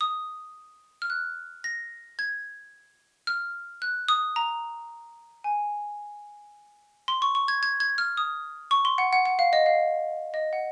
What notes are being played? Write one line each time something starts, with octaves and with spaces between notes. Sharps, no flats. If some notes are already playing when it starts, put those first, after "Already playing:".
D#6
F6
F#6
A#6
G#6
F6
F#6
D#6
A#5
G#5
C6
C#6
C#6
G#6
G#6
G#6
F6
D#6
C#6
C6
F#5
F#5
F#5
F5
D#5
F5
D#5
F#5